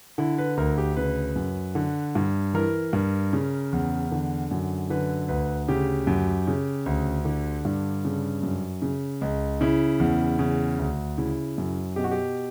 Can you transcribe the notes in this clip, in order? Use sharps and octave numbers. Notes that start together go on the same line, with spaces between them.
D3 E4
B4
D2 A#4
G4
C#3 B4
F#2
D3
G2
E3 A#4
G2
C#3
E2
D3
F#2
D3 B4
D2 B4
C#3 G4
F#2
C#3
D2
D3
G2
C#3
F#2
C#3
C#2
C#3 E4
E2
C#3
D2
C#3 E4
F#2
B2 G4
F#4
G4